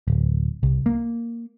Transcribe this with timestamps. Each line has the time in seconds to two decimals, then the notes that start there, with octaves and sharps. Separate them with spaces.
0.08 D1
0.63 C2
0.86 A#3